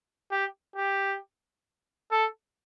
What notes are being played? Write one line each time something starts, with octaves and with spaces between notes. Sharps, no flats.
G4
G4
A4